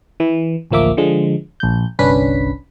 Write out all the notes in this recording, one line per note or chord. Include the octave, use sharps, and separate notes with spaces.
E3
A1 D2 F3 A#3 E5 D6
D3 F3 G#3
A#1 G6
G1 C2 C#4 D4 B4 B6